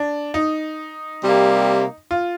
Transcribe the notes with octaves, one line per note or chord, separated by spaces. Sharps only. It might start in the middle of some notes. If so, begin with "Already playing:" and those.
Already playing: D4
D#4
C3 G3 A#3
F4